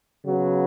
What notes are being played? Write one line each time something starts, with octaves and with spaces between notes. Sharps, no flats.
C#3 F#3 B3